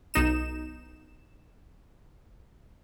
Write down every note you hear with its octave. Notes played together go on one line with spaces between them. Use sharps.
B1 D#4 E7